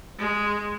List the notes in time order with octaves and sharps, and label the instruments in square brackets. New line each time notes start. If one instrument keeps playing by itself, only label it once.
[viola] G#3